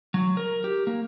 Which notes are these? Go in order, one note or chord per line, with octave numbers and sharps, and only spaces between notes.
F#3
A#4
G4
A#3